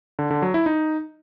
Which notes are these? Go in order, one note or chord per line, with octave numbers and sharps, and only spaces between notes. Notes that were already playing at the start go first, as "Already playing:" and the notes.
D3
D3
F#3
E4
D#4